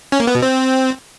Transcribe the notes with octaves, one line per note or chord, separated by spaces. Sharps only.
C#4
A#3
B3
B2
C4